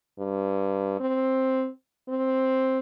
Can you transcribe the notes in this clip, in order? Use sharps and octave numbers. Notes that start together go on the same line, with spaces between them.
G2
C4
C4